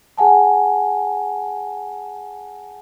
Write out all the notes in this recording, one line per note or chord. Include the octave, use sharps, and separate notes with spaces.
G#4 F#5 G#5 A5